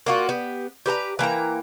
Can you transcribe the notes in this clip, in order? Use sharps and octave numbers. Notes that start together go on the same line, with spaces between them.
A#3 F4 F#4
B3 G4
G4 B4 A5 A#5
E3 A#3 G5 A#5